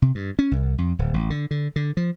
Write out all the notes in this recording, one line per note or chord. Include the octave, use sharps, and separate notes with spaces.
C3
G2
C#4
C2
F2
D1
A1
D3
D3
D3
F3